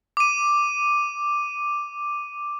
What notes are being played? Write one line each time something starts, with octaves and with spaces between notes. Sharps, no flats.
D6 D#7